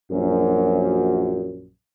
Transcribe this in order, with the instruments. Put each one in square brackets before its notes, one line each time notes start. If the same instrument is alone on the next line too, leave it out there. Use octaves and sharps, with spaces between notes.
[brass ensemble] A#1 F#2